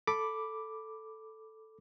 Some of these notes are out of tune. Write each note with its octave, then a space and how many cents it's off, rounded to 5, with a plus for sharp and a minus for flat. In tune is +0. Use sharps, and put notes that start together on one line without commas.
A4 +0 B5 +0 D6 +0